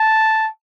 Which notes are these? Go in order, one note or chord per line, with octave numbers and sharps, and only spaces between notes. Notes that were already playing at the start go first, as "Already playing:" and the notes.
Already playing: A5